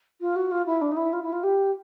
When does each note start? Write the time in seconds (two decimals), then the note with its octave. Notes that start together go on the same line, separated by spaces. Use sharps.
0.21 F4
0.36 F#4
0.51 F4
0.66 E4
0.81 D4
0.92 D#4
0.97 E4
1.13 F4
1.23 E4
1.32 F4
1.43 G4